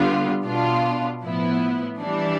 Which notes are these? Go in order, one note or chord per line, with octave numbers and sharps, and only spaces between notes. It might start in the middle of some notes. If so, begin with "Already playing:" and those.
Already playing: D3 G3 B3 F4
B2 B3 D4 F4
A2 F3 B3 E4
E3 G3 D4